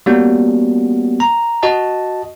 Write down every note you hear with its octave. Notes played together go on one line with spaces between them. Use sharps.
G3 A#3 B3 C#4 F#4
A#5
F#4 D#5 A5